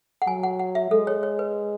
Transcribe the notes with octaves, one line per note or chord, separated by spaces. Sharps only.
F#5
F#3 G#5
F#5
F#5
E5
G#3 A4
C#5
C#5
B4